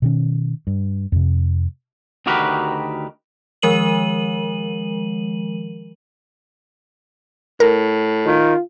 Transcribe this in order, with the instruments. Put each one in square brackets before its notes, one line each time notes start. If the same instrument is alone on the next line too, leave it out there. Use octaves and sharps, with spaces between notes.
[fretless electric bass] B2 D#3 C#4
G2
F2 C3
[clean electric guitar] D2 D#3 F#4 G4 A#4 B4
[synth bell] D#3 F3 G#3 A#4 D#7 F#7
[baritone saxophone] A2 [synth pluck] A#4
[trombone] D#3 [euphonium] F4